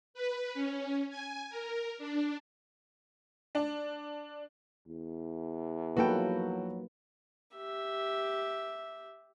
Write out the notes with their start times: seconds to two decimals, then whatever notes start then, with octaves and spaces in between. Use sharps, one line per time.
0.14 B4
0.54 C#4
1.10 G#5
1.50 A#4
1.98 D4
3.55 D4
4.87 E2
5.97 F3 F#3 A#3 D#4 F#4 A4 B4 G5
7.56 G4 E5